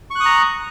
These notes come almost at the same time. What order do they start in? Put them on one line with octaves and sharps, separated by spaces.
C#6 F#6 D#6 A#5